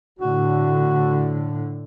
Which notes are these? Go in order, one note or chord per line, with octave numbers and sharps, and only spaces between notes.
A2 D3 F#4